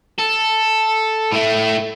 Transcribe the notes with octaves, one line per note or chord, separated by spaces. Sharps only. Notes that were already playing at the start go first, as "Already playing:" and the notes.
A4
A2 A3